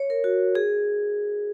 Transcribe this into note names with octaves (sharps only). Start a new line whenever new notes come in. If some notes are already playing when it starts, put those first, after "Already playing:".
Already playing: C#5
A#4
F#4
G#4